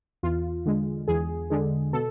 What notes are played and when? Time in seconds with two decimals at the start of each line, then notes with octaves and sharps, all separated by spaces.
0.23 E2 F4
0.66 D3 G#3
1.08 E2 G#4
1.50 D3 G#3
1.93 B2 A4